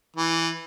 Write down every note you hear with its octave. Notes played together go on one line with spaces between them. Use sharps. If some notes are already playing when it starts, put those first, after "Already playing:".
E3